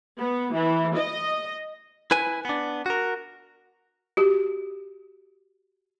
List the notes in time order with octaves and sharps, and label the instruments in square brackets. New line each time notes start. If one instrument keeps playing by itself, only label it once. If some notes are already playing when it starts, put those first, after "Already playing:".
[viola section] B3
E3
D#5
[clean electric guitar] E4 B4 G#5
B3 D4
F#4 A#4
[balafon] F#4 G4